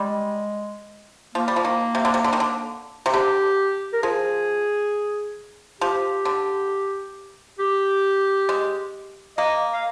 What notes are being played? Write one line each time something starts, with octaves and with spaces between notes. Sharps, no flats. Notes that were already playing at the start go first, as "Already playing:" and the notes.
Already playing: G3 G#3
F3 A#3
G3
F3
D#3
C3
D3
C3
D3
D#3
D3
C3
D3 G4
A#4
F3 G#4
F3 G4
D3
G4
G#3
A#3 D#5
F5